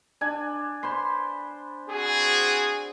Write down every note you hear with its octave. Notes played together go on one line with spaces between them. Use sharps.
D4 G#5
C5 B5 C6
C4 F#4 G#4